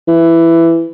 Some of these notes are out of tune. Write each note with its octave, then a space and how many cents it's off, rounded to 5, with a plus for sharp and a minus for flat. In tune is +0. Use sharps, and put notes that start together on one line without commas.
E3 +10